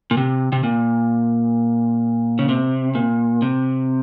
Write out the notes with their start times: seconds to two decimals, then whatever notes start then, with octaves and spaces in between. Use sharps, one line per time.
0.11 A#2
0.17 C3
0.52 C3
0.63 A#2
2.39 C#3
2.49 C3
2.95 A#2
3.42 C3